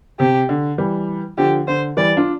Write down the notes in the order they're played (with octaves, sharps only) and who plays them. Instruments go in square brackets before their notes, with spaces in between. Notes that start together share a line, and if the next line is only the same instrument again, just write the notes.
[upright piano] C3 [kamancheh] G4
[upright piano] D3
E3 G3
[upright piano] D3 F3 [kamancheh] G4
[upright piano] D3 [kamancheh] C5
[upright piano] E3 G3 [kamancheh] D5
[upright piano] D4 F4